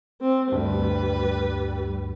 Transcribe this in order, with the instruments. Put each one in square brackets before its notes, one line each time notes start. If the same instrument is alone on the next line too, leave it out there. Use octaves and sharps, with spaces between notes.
[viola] C4
[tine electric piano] D2 G2 [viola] G3 B4